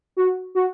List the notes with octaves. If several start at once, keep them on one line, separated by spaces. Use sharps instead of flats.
F#4
F#4